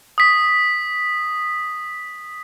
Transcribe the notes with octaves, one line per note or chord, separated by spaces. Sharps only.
D#6 B6